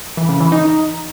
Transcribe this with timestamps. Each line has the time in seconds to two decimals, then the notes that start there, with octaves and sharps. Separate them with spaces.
0.17 E3
0.29 C#3
0.40 E3
0.52 D#4